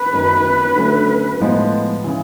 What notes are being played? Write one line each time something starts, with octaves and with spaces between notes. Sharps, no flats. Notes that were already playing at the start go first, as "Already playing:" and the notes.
Already playing: B4
F#2 D#3 F#3
D3 F#3 A3 C#4
A2 F3 G#3 B3
C#3 E3